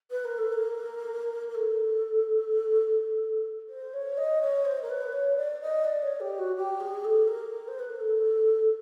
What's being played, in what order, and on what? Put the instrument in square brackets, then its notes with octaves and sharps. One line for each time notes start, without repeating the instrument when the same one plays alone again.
[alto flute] B4
A#4
A4
A#4
A#4
A4
C5
C#5
D#5
C#5
C5
A#4
B4
C#5
D5
D#5
D5
C#5
G4
F#4
G4
G#4
A4
A#4
C5
B4
A#4
A4